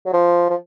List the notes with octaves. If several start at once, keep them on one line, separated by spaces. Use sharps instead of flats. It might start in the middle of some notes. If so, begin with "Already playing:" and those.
F#3
F3
F3